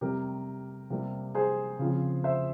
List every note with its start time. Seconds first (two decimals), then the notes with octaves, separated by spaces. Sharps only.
0.01 C3 G3 C4 G4 A#4
0.90 C3 G3 A#3
1.35 G#4 C5
1.79 C#3 F3 C4
2.24 C5 E5